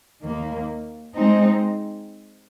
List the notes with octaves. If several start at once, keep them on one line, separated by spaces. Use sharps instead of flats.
D#2 D#3 A#3
G#3 C4 D#4